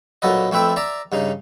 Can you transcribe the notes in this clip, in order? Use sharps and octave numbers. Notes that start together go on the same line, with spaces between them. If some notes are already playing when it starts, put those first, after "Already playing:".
B1 A#2 F#3 A4 B4 D#5
F2 A3 C4 B4 E5 G5
D5 E5 A#5
G2 C#3 D#4